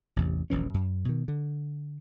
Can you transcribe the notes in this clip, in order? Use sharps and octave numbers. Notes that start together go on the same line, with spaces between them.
A1 E2 C3
D#1 A#1 E3 C#4
F#2
B2 D#3
D3